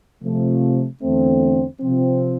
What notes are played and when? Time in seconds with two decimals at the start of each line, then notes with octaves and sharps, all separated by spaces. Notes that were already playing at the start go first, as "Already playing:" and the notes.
0.23 C3 F3 A3
1.02 E2 D3 A3 C4
1.80 C3 F3 C4